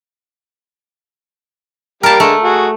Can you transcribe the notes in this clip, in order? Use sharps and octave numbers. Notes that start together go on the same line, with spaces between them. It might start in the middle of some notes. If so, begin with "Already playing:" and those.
G3 A#3 G4 A#4 A5
D3 G#3 A3
F#4 G#4